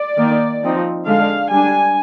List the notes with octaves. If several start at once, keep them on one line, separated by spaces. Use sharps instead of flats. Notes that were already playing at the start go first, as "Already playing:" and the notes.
Already playing: D5
D#3 A#3 D#4
F3 C4 D#4
D3 G#3 D4 F5
G3 D4 G#5